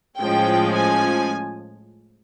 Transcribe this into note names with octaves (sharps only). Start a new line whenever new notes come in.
A2 F3 G#3 C#4 G5
G#5